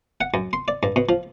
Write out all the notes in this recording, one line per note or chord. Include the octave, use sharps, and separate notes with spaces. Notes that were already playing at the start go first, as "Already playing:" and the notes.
F#5
F#2
C6
D5
G2
B2
F3